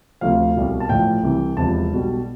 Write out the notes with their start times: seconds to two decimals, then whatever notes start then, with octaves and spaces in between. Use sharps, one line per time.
0.21 D2 C3 F3 F5
0.56 C2 B2 G3
0.80 A5
0.89 A1 A2 F3 G5
1.23 C2 C3 E3
1.57 E1 E2 C3 F3 A5
1.90 B1 B2 G3